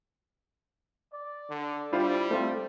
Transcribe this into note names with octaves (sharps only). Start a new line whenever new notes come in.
D5
D3
G3 D4 E4 F4 C5 F5 B5
A3 C4 F4 C5